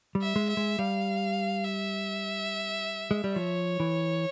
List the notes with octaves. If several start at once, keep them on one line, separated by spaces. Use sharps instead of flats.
G3
E5
G#3
E5
G#3
G3 F5
E5
G#3
G3
F3 C#5
E3